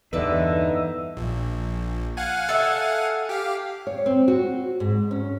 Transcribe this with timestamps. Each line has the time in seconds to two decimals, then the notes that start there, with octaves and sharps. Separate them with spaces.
0.13 E2 G2 D3 D#4 B4 D5 E5
1.17 A#1
2.17 F5 F#5 G#5
2.49 A4 E5
3.29 G4 F5
3.87 C#5
4.06 C4
4.28 F#4
4.80 G#2
5.11 C#4